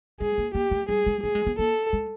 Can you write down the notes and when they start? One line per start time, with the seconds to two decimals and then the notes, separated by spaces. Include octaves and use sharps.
0.20 G#3 G#4
0.38 A#3
0.55 A#3 G4
0.71 A3
0.89 G3 G#4
1.06 G#3
1.23 A3 G#4
1.35 G#3
1.47 B3
1.59 A#3 A4
1.93 G#3